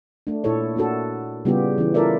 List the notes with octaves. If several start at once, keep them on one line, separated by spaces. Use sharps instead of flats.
A3 D4
A#2 E4 A4 C#5
A#3 D4 F#4 A4
C#3 G3 B3 E4 F4 G4
E3 C#4
E4 F4 A4 A#4 D5 E5